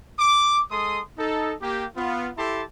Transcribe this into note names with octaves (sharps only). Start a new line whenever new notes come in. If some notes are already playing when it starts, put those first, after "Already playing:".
D6
G#3 A4 C6 D#6
D#4 A4
A#3 G4
B3 F4
E4 G4 A4 A5 C6